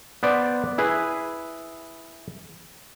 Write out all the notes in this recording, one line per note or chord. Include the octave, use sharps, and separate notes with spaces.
B3 C5 D5
E4 G#4 B4